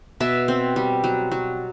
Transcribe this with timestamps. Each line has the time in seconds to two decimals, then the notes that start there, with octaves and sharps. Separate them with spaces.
0.20 B2 E5
0.48 C4
0.76 G3
1.04 F#3
1.31 F#3